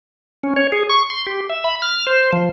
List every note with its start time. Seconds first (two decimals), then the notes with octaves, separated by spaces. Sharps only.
0.43 C#4
0.56 C#5
0.72 G#4
0.90 C#6
1.10 C6
1.27 G4
1.49 E5
1.64 B5
1.82 F6
2.07 C5
2.33 F3